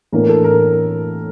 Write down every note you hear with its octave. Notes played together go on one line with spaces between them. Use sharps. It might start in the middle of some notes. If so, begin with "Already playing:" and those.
A2 E3 A#3 D4 A#4
A4
A#4